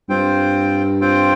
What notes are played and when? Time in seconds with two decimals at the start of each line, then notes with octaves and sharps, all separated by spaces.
0.09 G2 C4 F4 C5 G5
1.01 C4 F4 C5 G5